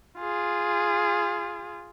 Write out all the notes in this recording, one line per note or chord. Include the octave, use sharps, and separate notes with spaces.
F4 G#4